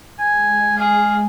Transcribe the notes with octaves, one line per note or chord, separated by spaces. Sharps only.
G#3 G#5
G#4 F5